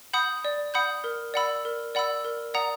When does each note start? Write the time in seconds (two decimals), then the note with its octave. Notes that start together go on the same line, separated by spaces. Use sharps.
0.13 F#5 B5 D#6 G6
0.45 D5
0.74 F#5 B5 D#6 G6
1.04 A#4
1.34 D5 F#5 B5 E6
1.65 A#4
1.95 D5 F#5 B5 E6
2.25 A#4
2.54 D5 F#5 A#5 D#6